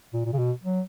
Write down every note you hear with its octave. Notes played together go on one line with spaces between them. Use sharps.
A#2
A#2
C#3
B2
F#3